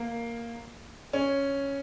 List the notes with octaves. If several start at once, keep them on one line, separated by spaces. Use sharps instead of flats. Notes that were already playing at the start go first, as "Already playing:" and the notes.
Already playing: A#3
C#4